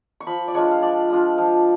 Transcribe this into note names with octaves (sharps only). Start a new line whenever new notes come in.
C#6
F3 B5
D5
G#3 D4 F4 C#5
F5
F3 D5
G#3 D4 F4
F3 F5